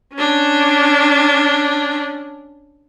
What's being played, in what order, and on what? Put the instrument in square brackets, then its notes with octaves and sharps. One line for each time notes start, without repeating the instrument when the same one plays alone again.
[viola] C#4 D4